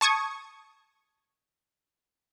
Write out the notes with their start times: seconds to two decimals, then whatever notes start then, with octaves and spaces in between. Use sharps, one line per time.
0.01 A5 C#6 D#6 G#6